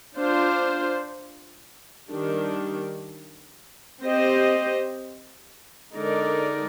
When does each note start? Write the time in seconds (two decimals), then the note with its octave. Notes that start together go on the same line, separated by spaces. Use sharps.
0.16 D4 F4 C5
2.09 D#3 G3 D4
4.02 C4 G4 C5 D#5
5.94 D3 G#3 D#4 A#4 D5